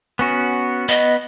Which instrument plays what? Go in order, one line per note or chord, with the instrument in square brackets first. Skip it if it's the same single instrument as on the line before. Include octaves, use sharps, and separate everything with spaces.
[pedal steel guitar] B3 C#4 F#4
[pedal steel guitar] B3 [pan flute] D#5